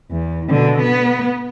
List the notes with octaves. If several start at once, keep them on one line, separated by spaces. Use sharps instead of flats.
E2
B2 D3
B3